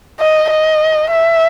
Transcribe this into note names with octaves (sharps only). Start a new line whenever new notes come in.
D#5
D#5
E5